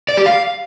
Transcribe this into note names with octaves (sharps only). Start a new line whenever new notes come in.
D5
G4
F5